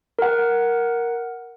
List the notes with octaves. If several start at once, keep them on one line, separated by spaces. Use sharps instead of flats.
A#4 F#5